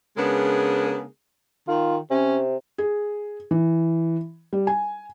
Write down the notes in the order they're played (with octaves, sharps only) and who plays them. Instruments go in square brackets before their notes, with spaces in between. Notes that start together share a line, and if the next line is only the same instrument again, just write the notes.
[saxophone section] C#3 G#3 B3 D4 G#4 A#4
[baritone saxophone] D#3 [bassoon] F4
[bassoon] C3 [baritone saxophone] C#4
[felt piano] G#4
E3
G3
G#5